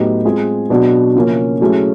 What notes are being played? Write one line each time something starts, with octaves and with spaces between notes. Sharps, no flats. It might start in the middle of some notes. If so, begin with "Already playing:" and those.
Already playing: A2 F#3 B3 D#4 G4
G#3 C4 F4 G#4
B2 F#3 B3 D4
C#3 F3 A#3 C#4
F#3 A3 C#4 E4 G#4